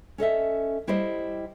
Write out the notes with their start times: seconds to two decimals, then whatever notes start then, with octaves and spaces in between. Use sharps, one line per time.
0.18 C#4 A4 D#5 E5
0.87 G3 E4 G4 C5 D#5